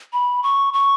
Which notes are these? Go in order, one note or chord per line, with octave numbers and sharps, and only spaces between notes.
B5
C#6
C#6